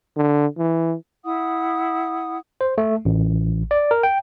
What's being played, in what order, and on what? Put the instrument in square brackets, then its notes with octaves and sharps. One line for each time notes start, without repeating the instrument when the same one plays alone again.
[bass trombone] D3
E3
[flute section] E4 F#5 D#6
[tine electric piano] C5
A3
A1
D5
A#4
G5